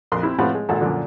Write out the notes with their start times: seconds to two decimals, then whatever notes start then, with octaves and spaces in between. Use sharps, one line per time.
0.12 A#1 F2 A#4 C6 F#6
0.23 C4 E4
0.39 A2 F3 C4 F4 B4 F#5
0.54 G#3
0.69 G#1 A#2 A4 F#5
0.80 F#2 A#2 D3 F3